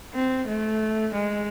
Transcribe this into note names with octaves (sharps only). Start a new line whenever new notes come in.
C4
A3
G#3